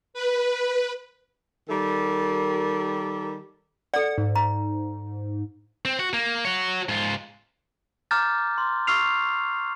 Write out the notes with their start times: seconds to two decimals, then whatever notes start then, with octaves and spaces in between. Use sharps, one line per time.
0.14 B4
1.69 D#3 G3 A4 A#4
3.94 A4 D5 F#5
4.18 G#2
4.36 A#5
5.85 C4
5.99 F#4
6.13 A#3
6.45 F#4 C#5
6.89 G#2 F4
8.11 A#5 D6 F6 G6 A6
8.58 C6
8.87 C#6 E6 F6 C7 F7